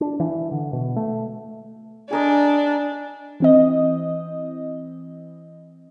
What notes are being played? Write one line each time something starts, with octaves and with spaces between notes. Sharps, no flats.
D4
E3
D3
B2
A3
D4 G#4 A#4 D#5
E3 C4 D#5